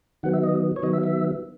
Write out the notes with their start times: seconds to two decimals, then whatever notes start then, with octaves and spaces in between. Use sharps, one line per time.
0.23 D#3 F#3 B3 F#5
0.33 E5
0.43 D#5
0.76 C#5
0.83 D#3 F#3 B3 D#5
0.93 E5
1.03 E5